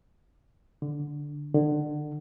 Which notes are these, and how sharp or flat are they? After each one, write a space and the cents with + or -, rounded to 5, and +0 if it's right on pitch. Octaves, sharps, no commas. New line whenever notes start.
D3 +0
D3 +30